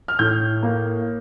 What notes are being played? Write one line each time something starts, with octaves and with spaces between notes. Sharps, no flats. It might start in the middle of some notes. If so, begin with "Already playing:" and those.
F6
A2 G6
A#3